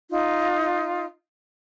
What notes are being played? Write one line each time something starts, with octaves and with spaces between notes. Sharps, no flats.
D#4 F4